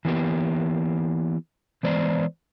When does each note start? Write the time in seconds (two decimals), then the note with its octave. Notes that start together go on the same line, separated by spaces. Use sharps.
0.05 E3 A#3 B3 G4
1.83 E3 G#3 B3 C5 D5